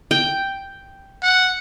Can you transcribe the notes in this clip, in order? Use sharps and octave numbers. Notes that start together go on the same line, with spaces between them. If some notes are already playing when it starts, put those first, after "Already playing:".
G5
F#5